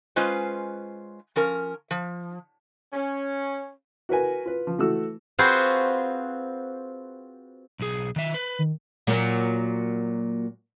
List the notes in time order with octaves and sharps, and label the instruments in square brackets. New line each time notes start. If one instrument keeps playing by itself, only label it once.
[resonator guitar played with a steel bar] G#3 C#4 F4 B4 C5
F3 C#4 A#4
F3
[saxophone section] C#4
[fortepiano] F#4 A#4 B4 G#5
F4 B4
F3
E3 A3 F#4 E6
[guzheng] C4 F4 F#4 G#4 B4 C5
[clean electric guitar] B1 G#4
D#3 E5
B4
[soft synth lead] D#3
[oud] A#2 F#3 A#3